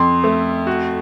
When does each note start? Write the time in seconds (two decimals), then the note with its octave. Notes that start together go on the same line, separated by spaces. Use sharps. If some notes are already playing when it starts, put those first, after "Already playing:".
Already playing: F2 C6
0.24 A3
0.67 F#4